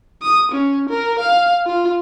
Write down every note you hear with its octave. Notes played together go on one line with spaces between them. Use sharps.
D#6
C#4
A#4
F5
F4